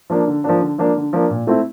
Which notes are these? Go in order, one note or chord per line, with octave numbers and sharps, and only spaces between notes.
F3 A#3 D4
D3
F3 A#3 D4
D3
F3 A#3 D4
D3
F3 A#3 D4
A#2
A3 C4 E4